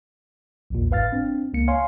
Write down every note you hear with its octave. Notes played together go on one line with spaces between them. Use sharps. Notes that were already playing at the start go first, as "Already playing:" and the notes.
A#1 E2 A#2
G1 G#2 B4 F5 F6 A6
C4 D4
C#2 A#3 C#7
C#5 F5 G#5 C6